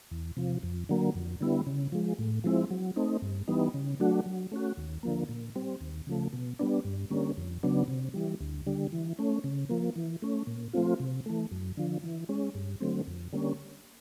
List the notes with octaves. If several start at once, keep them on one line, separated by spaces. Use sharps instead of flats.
E2
C3 F3
F2
D3 F#3 A#3
F2
D3 G3 B3 E4
C#3
F3 G#3
A2
F3 G#3 C4 E4
F#3
A3 C4 D#4
G2
E3 G3 B3 D#4
C#3
F#3 A3 D4 F#4
F#3
A3 C#4 F#4
D#2
D3 F3 A#3
A#2
G3 C4
D#2
C#3 F3 A3
B2
G3 B3 D4
G2
D3 G3 A#3 C#4
F2
C#3 F#3 B3 D4
C3
E3 G3
D2
D3 G3
E3
A3 C#4
C#3
F3 A#3
E3
A3 C#4
A#2
F3 A3 C4 F4
C3
E3 A3
F#2
D3 F3
E3
G#3 C#4
G2
D3 F#3 A3 C4
F2
D3 G3 A#3 C#4